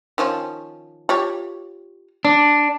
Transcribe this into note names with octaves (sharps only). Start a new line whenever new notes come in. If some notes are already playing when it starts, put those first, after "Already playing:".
D#3 F3 C#4
F4 G4 C#5
D4 D5